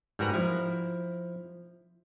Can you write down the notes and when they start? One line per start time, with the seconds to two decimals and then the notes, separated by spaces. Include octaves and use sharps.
0.19 G#2 G3 F#4 A#4 B4 A#5
0.34 F3 E4